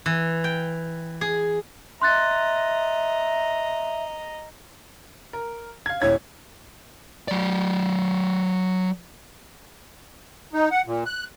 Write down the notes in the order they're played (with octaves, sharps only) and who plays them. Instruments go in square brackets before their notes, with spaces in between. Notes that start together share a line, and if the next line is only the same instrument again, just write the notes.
[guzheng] E3
G5
G#4
[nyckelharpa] D#5 A#5 [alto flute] E5 [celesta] C6 F#6 A6
[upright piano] A#4
F5 G#6
[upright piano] D#1 E4 G#6 [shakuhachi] C#5
[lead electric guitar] F#3 D5
[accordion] D#4
F#5
A#2
F#6